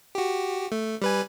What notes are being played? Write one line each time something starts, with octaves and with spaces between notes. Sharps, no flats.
F#4 G4
A3
G3 B4 G#5